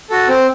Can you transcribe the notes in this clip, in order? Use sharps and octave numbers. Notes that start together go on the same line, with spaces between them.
F#4 A4
C4